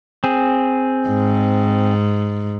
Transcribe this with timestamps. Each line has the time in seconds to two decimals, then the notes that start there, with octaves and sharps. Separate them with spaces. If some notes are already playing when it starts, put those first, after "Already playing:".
0.24 C4 G#4
1.08 G#2